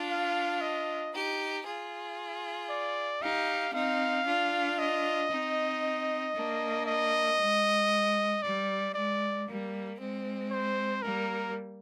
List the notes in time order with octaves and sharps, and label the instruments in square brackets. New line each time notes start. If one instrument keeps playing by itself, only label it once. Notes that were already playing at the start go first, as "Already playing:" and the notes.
Already playing: [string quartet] D4 F4
[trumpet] F5
D#5
[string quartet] D#4 G4
F4 G#4
[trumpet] D5
[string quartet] D#4 G4 [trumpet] F5
[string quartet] C4 D#4 [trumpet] F5
[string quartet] D4 F4
[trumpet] D#5
[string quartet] C4 D#4
A#3 D4
[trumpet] D#5
[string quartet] G#3
[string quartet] G3 [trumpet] D5
[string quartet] G#3 [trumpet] D5
[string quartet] G3 A#3
G#3 C4
[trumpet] C5
[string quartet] G3 A#3 [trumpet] A#4